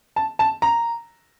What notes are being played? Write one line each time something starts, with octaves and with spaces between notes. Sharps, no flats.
A5
A5
A#5